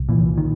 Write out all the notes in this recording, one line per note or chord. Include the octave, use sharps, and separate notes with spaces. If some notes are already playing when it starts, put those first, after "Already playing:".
Already playing: C2
A#2 E3
D#3